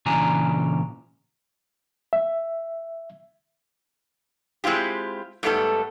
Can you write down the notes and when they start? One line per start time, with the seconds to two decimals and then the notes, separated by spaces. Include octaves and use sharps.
0.06 A#2 C#3 E3 D4 G#5 A#5
2.13 E5
4.64 G#3 C4 E4 F4 G4
5.43 G#2 G3 A3 B3 A4